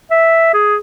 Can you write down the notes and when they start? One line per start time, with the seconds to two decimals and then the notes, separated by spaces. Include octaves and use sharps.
0.11 E5
0.53 G#4